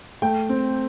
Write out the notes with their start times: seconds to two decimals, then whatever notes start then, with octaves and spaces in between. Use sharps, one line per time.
0.22 A3 G5
0.49 C4